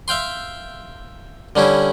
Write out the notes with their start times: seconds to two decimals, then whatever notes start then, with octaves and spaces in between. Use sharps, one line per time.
0.08 E5 F5 G5 C6
1.56 D3 G3 C#4 E4